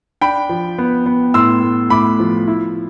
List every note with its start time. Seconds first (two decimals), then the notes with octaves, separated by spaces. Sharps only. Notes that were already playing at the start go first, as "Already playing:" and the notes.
0.21 D4 G5 B5
0.49 F3
0.78 B3
1.06 B3
1.34 A2 C6 E6
1.62 A3
1.90 A2 B5 D6
2.19 F3
2.48 E4